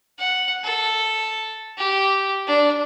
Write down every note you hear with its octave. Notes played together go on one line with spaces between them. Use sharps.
F#5
A4
G4
D4